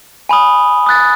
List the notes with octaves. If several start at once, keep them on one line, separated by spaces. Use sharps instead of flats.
G#5 B5 D#6
D#6 F#6 A6